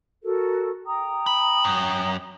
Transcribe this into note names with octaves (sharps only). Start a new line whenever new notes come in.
F#4 A4 A#4
G5 A#5 D#6
B5
F#2